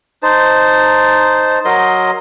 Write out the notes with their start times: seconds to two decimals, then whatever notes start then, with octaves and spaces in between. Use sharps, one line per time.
0.23 D#4 C5 A5
1.65 F#3 A#4 D#5 C6